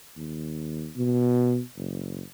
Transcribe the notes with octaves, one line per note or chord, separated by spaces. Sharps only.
D#2
B2
F#1